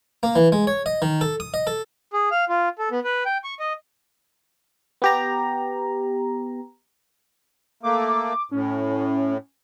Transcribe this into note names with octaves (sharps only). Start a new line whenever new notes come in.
A#3
E3
G#3
C#5
D#5
D#3
A4
D#6
D#5
A4
G#4
F5
F4
A4
B3
B4
G5
C#6
D#5
B3 G4 A#5
A3 A#3 D6
A2 C#4